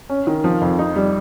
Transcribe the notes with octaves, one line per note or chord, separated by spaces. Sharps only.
C#4
D#3
F3
F2
D#4
G3